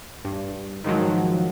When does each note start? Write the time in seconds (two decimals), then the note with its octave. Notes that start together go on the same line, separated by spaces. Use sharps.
0.25 G2
0.84 G#2 D#3 F3 F#3